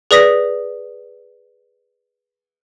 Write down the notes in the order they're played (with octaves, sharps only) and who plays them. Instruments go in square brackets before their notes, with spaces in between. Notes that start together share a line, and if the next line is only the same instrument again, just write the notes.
[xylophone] G#4 B4 D5 D#6 A#6 B6